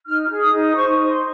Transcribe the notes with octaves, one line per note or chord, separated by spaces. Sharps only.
D#4 F6
G#4
D#6
D#4
C5 C#6
D#4
C6